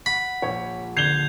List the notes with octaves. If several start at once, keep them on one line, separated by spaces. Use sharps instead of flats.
F#5 B5
A#1 C#5
D3 G6 G#6 C7 F7 G7